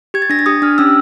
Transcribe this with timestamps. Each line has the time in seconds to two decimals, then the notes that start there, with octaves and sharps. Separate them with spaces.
0.14 G4 G#6
0.22 A6
0.30 D4 A#6
0.39 A6
0.46 G4 D#6
0.62 D4 F6
0.78 C#4 E6